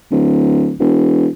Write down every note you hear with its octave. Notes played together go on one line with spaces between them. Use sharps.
D1
E1